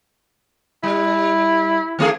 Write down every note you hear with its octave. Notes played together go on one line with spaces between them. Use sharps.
G3 E4
D#3 A3 G#4